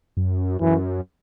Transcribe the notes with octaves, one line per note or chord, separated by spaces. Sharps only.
F#2
F#2 E3